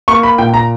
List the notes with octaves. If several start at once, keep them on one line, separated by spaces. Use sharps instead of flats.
A#3 C#6
B5
A#2 G5
A#5